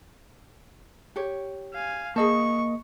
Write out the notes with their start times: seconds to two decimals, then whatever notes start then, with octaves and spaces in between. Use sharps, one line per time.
1.16 G4 C#5
1.74 F5 G#5
2.16 A#3 G#4 D#5 A5 C#6